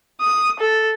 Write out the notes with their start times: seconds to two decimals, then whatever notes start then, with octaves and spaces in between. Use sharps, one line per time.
0.21 D#6
0.60 A4